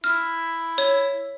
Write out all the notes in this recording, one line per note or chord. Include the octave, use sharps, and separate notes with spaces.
E4 F6
C#5